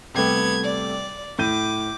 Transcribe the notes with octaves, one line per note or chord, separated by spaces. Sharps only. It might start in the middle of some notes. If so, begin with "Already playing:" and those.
C3 G3 A3 B3 G#6
D5
A2 D6 G6 D#7